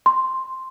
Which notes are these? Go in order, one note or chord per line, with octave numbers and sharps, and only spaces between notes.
C6